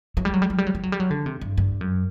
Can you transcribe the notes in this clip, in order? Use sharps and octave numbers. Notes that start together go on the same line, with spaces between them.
F#3
G3
F#3
G3
F#3
G3
F#3
G3
F#3
G3
F#3
D3
C3
G2
G2
F#2